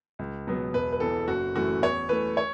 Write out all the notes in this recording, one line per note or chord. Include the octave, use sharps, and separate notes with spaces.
C#2
B2 F#3 B3
E1 B4
B4
E2 E3 A4
F#1 F#4
F#2 E3 A3 F#4
E2 C#5
E3 A3 B4
C#5